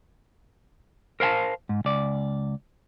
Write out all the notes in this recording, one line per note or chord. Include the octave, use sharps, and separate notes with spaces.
A#4 C5 F5 G#5 A5
G#2
C#2 D5